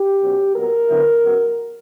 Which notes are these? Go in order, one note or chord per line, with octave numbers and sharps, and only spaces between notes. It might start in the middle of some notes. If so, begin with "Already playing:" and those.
Already playing: G4
B2 F#3 C#4
A#2 F#3 B3 A#4
D3 F#3 B3 E4
C#3 F#3 B3